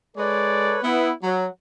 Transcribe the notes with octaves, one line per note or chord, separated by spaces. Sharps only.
G#3 A4 B4 C#5 D5
B3 E4
F#3